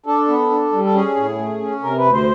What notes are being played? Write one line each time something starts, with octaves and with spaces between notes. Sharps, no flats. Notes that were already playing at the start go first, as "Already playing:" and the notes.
D4 A4
B3
D4
G3
A4
C#4 G#4
A2
A3
C#4
C3 A#4
B4
D2
C5